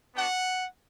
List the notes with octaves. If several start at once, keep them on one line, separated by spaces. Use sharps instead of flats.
B3 D4 F#4 F#5